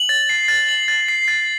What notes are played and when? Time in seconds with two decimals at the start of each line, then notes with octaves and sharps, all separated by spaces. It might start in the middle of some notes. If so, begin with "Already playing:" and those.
Already playing: F#7
0.09 A6
0.29 C7
0.48 A6
0.69 F#7
0.88 A6
1.08 C7
1.28 A6